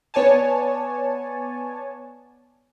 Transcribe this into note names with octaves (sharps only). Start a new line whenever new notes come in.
B3 C#5 D5 G#5 A5